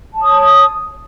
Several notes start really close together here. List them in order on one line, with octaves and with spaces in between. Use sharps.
A5 C#5 D#6